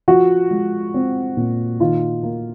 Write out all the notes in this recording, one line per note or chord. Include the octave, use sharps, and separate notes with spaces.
F3 F#4
G#3
C4
A#2
D#3 F4
A#3